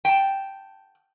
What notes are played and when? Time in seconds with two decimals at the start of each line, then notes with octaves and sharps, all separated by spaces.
0.05 G5 A5